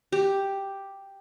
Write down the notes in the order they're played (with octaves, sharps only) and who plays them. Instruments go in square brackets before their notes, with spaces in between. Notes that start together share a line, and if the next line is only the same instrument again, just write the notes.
[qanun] G4